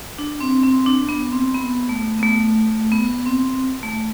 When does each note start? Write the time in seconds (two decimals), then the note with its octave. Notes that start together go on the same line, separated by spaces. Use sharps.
0.19 D4
0.41 C4
0.64 C4
0.86 D4
1.09 B3
1.32 C4
1.54 B3
1.89 A3
2.19 B3
2.23 A3
2.92 B3
3.26 C4
3.83 A3